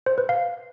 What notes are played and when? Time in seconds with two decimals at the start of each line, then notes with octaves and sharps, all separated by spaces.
0.06 C5
0.18 B4
0.29 F5